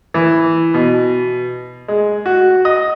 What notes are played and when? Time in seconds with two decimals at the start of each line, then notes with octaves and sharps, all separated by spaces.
0.14 E3
0.74 B2
1.88 G#3
2.26 F#4
2.65 D#5